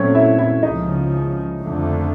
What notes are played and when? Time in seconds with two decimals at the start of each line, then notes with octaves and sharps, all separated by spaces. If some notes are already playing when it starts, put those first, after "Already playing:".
Already playing: A#2 F#3 A3 C4 C#4 C#5
0.15 E4 E5
0.38 E4 E5
0.63 C#2 C#3 F3 D#4 D#5
1.60 F2 D3 F3 A3